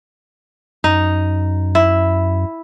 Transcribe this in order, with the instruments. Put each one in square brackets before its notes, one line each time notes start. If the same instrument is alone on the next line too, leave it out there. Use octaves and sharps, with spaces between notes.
[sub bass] F#2 [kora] D#4
[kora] E4